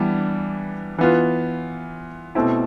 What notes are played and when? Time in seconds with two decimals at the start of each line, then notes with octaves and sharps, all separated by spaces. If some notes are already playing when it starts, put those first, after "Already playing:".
Already playing: E3 G3 B3 D4
0.98 E3 B3 F4
2.35 B2 A3 C4 E4